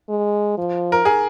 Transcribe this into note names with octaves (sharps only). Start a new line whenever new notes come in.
G#3
F3
A#4
G#4